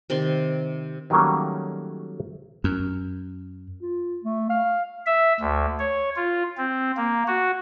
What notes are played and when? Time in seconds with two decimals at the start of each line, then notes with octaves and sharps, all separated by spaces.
0.10 C3 D#3 D5 C6
1.10 D#3 F#3 G3 A3 A#3 C#4
2.64 F#2
3.81 F4
4.24 A3
4.50 F5
5.07 E5
5.40 D2
5.79 C#5
6.16 F4
6.58 C4
6.97 A#3
7.27 F#4